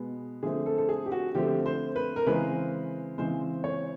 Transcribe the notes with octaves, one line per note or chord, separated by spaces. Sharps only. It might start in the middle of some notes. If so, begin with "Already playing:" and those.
Already playing: B2 G#3 B3
D3 F3 A3 C4 G#4
A4
A4
G#4
G4
F#4
D3 F3 A3 C4 G4
C5
B4
A#4
C#3 E3 G#3 C4 B4
C#3 E3 G#3 C4 C5
C#5